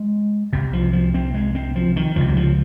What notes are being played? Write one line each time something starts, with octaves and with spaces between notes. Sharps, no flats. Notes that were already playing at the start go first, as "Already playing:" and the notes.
Already playing: G#3
C2 C3
F3
F3
C4
G#3
C4
F3
D#3
C#2 C3 F3
F#3
F3